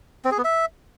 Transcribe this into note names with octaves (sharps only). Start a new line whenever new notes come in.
C4
G#4
B3
E5